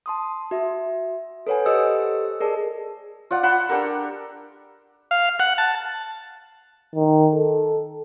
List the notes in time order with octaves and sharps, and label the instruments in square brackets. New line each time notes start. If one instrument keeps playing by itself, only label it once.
[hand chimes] A5 C6 D#6
F#4 E5
A4 B4 C#5 F#5 G#5
G4 A4 C5 D#5 D#6 E6
G#4 A#4 D5 A5
[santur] F4 D5 F#5
F#5 A5 B5 C6
D4 G4 A4 A#4
[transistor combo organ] F5
F#5
A5
[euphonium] D#3
A4